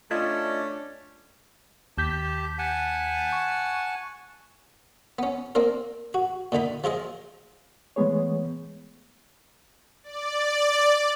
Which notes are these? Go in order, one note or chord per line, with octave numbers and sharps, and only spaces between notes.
A3 C#4 D4 F4 D#5 G#6
D#2 G4 A5 G6 B6
F#5 G#5 A5
C#6
B3 C#4
A#3 C4 D4 A#4
F#4
A#2 D3 D#4 B5
F3 F4 G#4 D#5
E3 G#3 A3 B3 G#4 C#5
D5